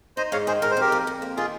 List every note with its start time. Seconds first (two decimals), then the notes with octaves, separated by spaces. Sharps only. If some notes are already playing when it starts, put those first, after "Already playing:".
0.17 D#4 C5 D#5
0.32 G#2 C#5 F5
0.47 D#3 G#4 C5
0.62 G#2 A#4
0.71 C5
0.77 F2 G4 A#4
0.92 F2
1.07 F2
1.22 A#3
1.37 D#3 F4 G#4